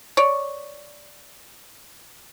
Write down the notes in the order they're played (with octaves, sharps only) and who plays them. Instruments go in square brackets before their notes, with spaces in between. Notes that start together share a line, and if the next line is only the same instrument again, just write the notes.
[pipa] C#5 D5